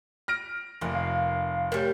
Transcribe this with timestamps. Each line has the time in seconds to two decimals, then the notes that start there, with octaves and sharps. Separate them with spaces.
0.28 F6 A#6 D7
0.81 F1 A#3
0.94 F5
1.72 A2 G3 A#4